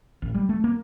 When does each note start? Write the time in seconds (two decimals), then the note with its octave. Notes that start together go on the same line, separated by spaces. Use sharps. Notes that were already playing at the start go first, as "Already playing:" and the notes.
0.22 A1
0.34 G3
0.49 A3
0.64 A#3